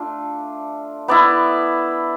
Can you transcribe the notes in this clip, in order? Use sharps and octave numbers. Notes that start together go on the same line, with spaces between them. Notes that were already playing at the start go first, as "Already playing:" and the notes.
Already playing: A3 D4 F4
B3 E4 D5